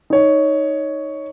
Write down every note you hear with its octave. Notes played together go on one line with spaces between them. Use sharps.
D#4 C#5